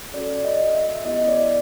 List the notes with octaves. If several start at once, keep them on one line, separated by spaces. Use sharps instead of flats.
C#4 F#4 A4 D5
D#5
E5
B3 E4 G4 D#5
D5